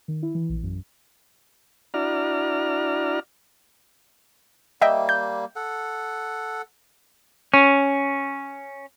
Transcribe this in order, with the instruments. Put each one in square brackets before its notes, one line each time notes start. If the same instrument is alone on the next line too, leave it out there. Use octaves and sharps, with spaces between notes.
[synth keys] D#3
E4
E3
A#1
F#2
[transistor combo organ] D4 E4 F#4 D5 A#5 F6
[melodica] G3 A#3 [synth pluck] D#5 E5 G5
[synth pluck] G6
[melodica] A4 F#5
[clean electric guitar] C#4